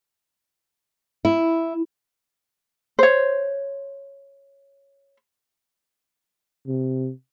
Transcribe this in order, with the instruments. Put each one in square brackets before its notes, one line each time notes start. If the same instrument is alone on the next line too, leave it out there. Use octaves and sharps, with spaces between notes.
[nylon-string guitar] E4
[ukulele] C5 C#5
[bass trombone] C3